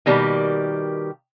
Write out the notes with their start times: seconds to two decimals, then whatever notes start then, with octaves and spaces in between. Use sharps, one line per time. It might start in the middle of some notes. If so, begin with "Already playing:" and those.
0.06 B2 D#3 G3 A#3 G4